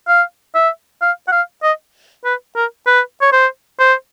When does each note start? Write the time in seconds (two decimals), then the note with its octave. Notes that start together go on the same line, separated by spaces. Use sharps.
0.08 F5
0.55 E5
1.01 F5
1.28 F#5
1.32 F5
1.63 D#5
2.25 B4
2.56 A#4
2.86 B4
3.21 C#5
3.32 C5
3.79 C5